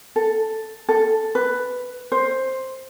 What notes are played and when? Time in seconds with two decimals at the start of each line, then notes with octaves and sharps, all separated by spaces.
0.16 A4
0.89 A4
1.35 B4
2.12 C5